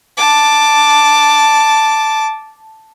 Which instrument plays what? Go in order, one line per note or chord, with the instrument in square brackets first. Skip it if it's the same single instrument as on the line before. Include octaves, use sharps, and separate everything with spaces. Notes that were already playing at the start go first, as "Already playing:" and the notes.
[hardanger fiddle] A5 D6